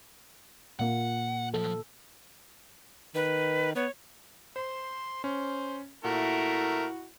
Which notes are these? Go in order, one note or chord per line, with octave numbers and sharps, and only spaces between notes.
A#2 A#3 F#5
F3 F#3 A4
D#3 B4
B3 C#5
C5 C6
C#4 C5
A#2 A3 E4 F#4 A#4